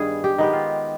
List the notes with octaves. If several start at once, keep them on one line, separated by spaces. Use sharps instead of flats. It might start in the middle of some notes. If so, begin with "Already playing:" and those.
Already playing: G2 D#3 B3 G#4
G4
D#3 G#3 B3 G4
F4